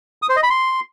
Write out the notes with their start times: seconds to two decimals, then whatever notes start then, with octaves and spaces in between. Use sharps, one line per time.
0.22 D#6
0.29 C5
0.36 D#5
0.43 B5
0.50 C6